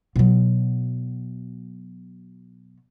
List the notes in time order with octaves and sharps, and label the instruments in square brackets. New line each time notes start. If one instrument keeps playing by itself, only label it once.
[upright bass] B2 F#3